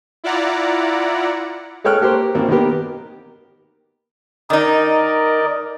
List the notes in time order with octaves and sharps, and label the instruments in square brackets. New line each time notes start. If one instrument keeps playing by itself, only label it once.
[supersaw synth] E4 F4 D5 F#5 A#5
[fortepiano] G#3 A4 C#5 G5 F6 F#6
A#3 G4 A#4 C5
G#1 A#3 C4
D#3 A#3 B3 G4 A#4
[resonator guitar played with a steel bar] D#3 D#4 [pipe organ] A#4 D5 D#5